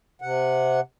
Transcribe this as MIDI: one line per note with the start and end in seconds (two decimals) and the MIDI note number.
0.22 0.80 48
0.22 0.80 78